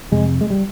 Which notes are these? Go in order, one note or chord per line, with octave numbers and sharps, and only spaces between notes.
F2 C3 G#3
G#3
G3